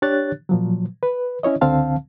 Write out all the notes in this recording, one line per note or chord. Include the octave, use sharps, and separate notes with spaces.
D4 G4 C#5 F#6 A6
A#2 F3 F#3
B4
C#4 E4 C#5 D#5
C#2 D3 C4 F5 A5